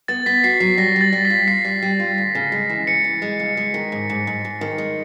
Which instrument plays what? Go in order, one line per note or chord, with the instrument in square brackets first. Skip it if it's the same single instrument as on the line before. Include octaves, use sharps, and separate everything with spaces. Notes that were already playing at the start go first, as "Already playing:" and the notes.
[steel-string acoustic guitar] B3 [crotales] A6
[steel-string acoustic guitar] B3 [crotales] B6
[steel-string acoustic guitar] F#4 [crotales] C7
[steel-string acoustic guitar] F#3 [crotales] C7
[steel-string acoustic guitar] G3 [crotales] A#6
[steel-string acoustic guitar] G3
[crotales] A6
[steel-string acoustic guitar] G3
[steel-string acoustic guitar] F4 [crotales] B6
[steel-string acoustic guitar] F4 [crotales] C7
[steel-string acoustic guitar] G3
G3
F4
D2
C#3
G#3
E3
[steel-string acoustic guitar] E3 [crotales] C#7
[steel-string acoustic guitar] E3
G#3
C#3
G#3
D#3
G#2
G#2
G#2
G#2
D#3
G#3